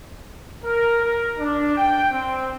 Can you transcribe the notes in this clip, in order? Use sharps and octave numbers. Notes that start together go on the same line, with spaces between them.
A#4
A#4
D4
G5
C4